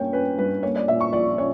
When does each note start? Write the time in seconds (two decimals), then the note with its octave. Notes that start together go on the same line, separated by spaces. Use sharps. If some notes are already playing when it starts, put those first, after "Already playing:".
Already playing: G2 A#3 C#4 C#5 G5
0.13 C#4 B4
0.38 G2 B4
0.63 A#3 C#5
0.76 D5
0.88 A#2 E5
1.00 C#6
1.13 A#1 D5
1.38 C#4 C#5